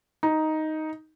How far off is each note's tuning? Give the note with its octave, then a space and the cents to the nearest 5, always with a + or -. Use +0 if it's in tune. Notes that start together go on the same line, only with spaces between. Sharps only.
D#4 +5